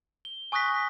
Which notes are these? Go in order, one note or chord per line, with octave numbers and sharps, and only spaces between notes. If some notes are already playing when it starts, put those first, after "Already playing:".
G7
G#5 C#6 D#6 F#6 A#6 B6